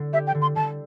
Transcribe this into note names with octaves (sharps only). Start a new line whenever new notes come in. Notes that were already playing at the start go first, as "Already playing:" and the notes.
Already playing: D3
G4 E5
G5
D3
C6
D3 A5